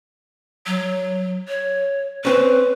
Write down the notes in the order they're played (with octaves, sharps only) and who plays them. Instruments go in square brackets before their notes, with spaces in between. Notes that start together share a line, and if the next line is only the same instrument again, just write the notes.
[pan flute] F#3
C#5
[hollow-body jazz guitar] C4 C#4 [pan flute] B4